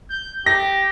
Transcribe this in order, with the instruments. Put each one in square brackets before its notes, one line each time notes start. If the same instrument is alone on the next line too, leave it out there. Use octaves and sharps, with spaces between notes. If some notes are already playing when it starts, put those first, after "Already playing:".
[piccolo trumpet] G6
[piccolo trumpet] G4 [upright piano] A#6